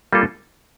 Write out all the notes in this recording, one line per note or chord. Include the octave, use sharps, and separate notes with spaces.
G3 A#3 F4 A4